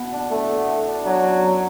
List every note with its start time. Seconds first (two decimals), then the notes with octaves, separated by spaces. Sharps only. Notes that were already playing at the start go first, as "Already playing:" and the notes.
Already playing: B2 E4 F#4
0.12 D4
0.31 A3 E4
0.50 B3
0.68 F#4
0.87 D4
1.06 F#3 E4
1.24 C#4
1.43 F#2